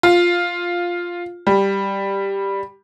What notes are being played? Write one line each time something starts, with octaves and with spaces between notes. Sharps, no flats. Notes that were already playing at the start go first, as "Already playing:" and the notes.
F4
G3